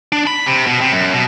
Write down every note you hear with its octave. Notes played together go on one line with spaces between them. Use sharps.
D4
B5
C3
B2
C3
F#2
B2